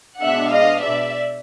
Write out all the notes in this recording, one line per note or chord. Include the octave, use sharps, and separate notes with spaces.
B2 G#3 B3 D4 E5 F#5
D#5 F5
D5 E5